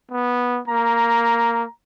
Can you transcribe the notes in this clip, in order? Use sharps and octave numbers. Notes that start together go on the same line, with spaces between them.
B3
A#3 A#5